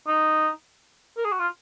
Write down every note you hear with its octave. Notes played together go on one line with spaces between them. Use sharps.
D#4
A#4
G#4
F#4
F4